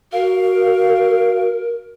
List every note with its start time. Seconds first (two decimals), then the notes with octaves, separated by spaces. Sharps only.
0.13 F#4 A#4 F5